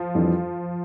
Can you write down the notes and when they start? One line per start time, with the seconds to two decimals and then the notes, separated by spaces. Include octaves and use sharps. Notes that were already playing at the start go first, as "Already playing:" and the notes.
Already playing: F3
0.15 F2 E3 G3 D4 F4